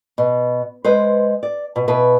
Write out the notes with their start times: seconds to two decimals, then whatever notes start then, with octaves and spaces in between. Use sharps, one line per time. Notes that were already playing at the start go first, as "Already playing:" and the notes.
0.18 B2
0.85 G#3 B4 C5
1.43 D5
1.76 B2
1.88 B2 E4 B4